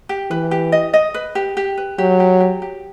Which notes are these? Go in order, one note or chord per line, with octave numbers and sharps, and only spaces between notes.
G4
E3 B4
G4
D#5
D#5
B4
G4
G4
B4
F#3 G4
G4
G4
G4